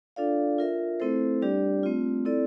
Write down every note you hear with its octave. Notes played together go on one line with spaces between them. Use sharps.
D4 F4 A4 D5 F5
F4 A#4 E5
A3 C4 E4 A4 C5
G3 D4 G4 D5
A3 C4 F4
C4 E4 A4 D5